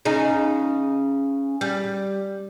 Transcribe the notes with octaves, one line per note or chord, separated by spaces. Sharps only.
C#3 D#4
G3